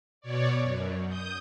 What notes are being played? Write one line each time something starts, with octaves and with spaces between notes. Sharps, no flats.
B2 C#5 D5
F#2
D#6 G6